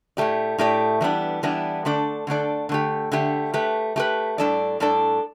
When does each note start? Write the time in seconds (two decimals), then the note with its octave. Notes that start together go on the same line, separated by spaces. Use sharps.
0.17 A2 A3 G4 D5
0.58 A2 A3 G4 D5
1.01 E3 G3 B3 D4
1.43 E3 G3 B3 D4
1.85 D3 A3 D4 A4 D5
2.27 D3 A3 D4 A4 D5
2.69 D3 A3 G4
3.12 D3 A3 G4
3.54 A3 G4 B4
3.96 A3 G4 B4
4.38 A2 G3 D4 A4 D5
4.80 A2 G3 D4 A4 D5